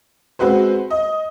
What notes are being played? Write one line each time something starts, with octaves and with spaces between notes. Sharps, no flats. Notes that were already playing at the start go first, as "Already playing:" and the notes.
G#3 C4 F#4 B4 C5
D#5